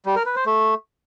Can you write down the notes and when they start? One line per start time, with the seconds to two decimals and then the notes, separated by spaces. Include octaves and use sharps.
0.06 G3
0.16 A#4
0.26 B4
0.36 C5
0.46 A3